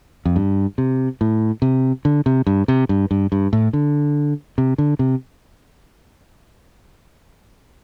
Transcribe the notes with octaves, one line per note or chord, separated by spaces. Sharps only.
F2
G2
C3
A2
C3
D3
C3
G2
C3
G2
G2
G2
A2
D3
C3
D3
C3